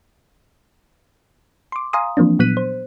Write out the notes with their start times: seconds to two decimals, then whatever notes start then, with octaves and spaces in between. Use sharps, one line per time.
1.72 C6 D6
1.93 F5 G#5 A#5 C6 D#6
2.17 E3 F3 A#3 C4 D4
2.39 A#2 F#3 B3 F#6 B6 D#7
2.57 C5